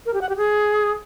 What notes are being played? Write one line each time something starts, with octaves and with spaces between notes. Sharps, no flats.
A#4
G4
F#5
G4
G#4